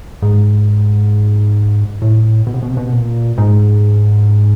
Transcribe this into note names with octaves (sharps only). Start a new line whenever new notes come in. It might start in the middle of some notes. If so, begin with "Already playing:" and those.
G#2
A2
B2
C3
B2
C3
B2
A#2
G#2